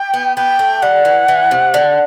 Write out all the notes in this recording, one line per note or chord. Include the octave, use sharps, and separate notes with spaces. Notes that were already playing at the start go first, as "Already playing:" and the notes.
Already playing: G5
B3
B3 G5
A3
G3 F#5
E3
E3
C3
D3